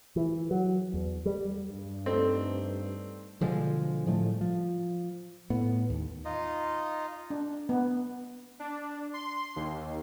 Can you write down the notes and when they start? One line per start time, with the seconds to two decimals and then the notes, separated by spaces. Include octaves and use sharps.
0.16 E3
0.51 F#3
0.94 E2
1.26 G3
1.71 G2
2.06 A3 C4 D4 D#4 A4
3.41 B2 D3 F3 G#3
4.06 A2 F3 G3 A3
4.41 F3
5.50 A2 B3
5.90 D#2
6.25 D#4 F4 D#5
7.30 D4
7.69 B3
8.60 D4
9.14 C6
9.56 D#2